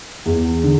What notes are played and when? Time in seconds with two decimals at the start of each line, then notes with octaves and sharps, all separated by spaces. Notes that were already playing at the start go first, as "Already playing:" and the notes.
0.26 E2
0.63 D3